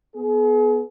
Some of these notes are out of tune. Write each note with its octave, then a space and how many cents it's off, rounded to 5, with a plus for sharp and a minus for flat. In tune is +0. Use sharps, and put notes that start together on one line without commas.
B3 +0 G#4 +40